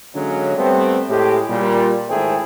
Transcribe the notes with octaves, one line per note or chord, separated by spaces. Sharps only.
D3 F#3 G#3 A#3 C#4
G3 A3 B3 C4
A2 G#3 G4
A#2 G3
G#1 A3 E4 G#4 C5 G5